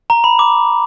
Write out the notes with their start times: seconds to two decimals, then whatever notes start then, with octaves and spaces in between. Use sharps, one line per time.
0.10 A#5
0.24 B5
0.39 D6